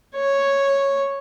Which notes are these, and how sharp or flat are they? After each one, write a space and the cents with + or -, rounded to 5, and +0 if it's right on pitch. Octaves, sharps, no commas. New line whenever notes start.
C#5 -5